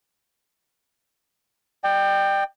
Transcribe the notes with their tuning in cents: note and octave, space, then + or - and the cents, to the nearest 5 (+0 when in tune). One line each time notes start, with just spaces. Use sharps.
D5 +40 G5 +5